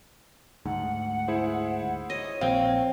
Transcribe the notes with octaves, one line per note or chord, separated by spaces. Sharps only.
D2 G#2 F#5
E4 G#4 C5
C#5 D#5
A#1 C4 F5